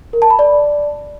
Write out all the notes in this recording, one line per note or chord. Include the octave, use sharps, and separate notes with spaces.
A#4
A5
B5
D5